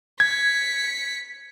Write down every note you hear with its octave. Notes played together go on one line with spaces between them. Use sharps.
G#6 B6 C#7